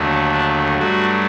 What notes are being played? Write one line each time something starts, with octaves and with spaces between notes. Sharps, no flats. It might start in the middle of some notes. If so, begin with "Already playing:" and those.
Already playing: D#2 D3 F#3 A3
D4
G2 F#3 A3 F#4